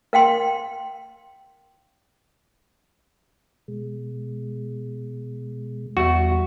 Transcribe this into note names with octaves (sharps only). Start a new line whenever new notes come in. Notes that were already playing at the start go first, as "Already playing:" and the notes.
A#4 F5 G5 C6
B2 G#3
E2 G3 F#4 E5